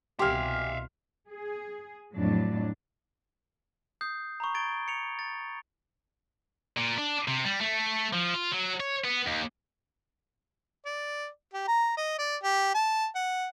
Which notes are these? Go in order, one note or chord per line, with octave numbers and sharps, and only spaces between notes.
C2 B2 G4 E5 F5 G#5 C6 F6
G#4
F2 A2 F#3 D4
D#6 G6 C7
A#5 B5 C#6
G#6 A6 D7 G7
C#7 F7
A6
A#2
D4
C3
G3
A3
F3
F4
F#3
C#5
B3
D#2
D5
G4
A#5
D#5
D5
G4
A5
F#5